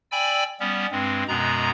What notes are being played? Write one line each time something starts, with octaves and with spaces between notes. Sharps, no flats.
D5 G5 G#5 B5 E6
G3 B3 C#4
G2 G#3 C4
F#2 B2 G#3 B3 A#5